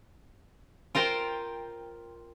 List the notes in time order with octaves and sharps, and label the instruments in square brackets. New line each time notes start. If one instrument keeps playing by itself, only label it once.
[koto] F4 A#4 C5 G5